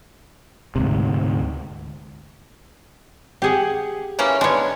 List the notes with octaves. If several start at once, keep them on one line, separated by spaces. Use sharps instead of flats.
D2 G#2 C3
G4 G#4 F#5
E3 A#3 C#4
G#3 B3 D4 C#5